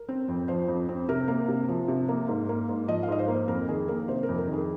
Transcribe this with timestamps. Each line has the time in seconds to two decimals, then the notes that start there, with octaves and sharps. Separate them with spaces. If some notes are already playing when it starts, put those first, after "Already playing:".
Already playing: A#4
0.09 C4
0.28 F2
0.48 F3 C5
0.68 F2
0.89 C4
1.08 C3 A#4
1.28 A#3
1.48 C3
1.68 F3
1.88 C3
2.09 A#3
2.28 G#2
2.49 A#3
2.69 G#2
2.88 F3 D#5
3.03 F5
3.08 G#2 D#5
3.19 C5
3.28 A#3
3.34 C5
3.48 F2 A#4
3.68 D#3 G#4
3.88 A#3 A#4
4.08 C3 C5
4.23 A#4
4.29 F2
4.38 A#4
4.48 D#3
4.53 G#4